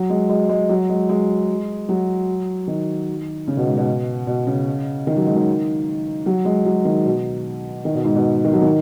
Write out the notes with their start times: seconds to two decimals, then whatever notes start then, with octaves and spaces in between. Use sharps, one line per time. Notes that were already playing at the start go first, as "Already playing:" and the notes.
Already playing: F#3
0.10 G#3
0.29 G#3
0.49 G#3
0.69 F#3
0.89 G#3
1.09 G#3
1.89 F#3
2.68 D#3
3.48 C#3
3.57 B2
3.67 G#2
3.77 B2
4.27 B2
4.47 C#3
5.07 D#3
5.16 F#3
5.26 G#3
5.36 D#3
6.26 F#3
6.45 G#3
6.65 F#3
6.85 D#3
7.06 B2
7.85 D#3
7.95 B2
8.04 G#2
8.15 B2
8.45 D#3
8.53 F#3
8.62 D#3